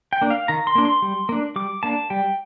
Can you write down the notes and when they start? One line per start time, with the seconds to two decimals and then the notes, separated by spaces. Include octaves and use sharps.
0.13 G5
0.21 A#3 D4
0.30 F5
0.48 D#3 A#5
0.67 C6
0.75 A#3 D4
0.85 C6
1.02 G3
1.29 A#3 D4
1.56 G3 D6
1.83 A#3 D4 A5
2.10 G3 G5